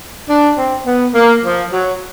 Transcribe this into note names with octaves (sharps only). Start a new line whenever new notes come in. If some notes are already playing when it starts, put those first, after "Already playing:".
D4
C4
B3
A#3
F3
F#3